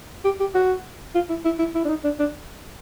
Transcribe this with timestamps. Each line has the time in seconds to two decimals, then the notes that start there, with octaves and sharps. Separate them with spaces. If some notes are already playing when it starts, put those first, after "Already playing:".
0.25 G4
0.40 G4
0.55 F#4
1.15 F4
1.30 E4
1.45 E4
1.59 E4
1.75 E4
1.85 D4
1.89 D#4
2.04 D4
2.19 D4